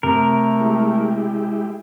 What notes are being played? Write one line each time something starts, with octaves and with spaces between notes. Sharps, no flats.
C3 A3 A#4
G#3 E4 G4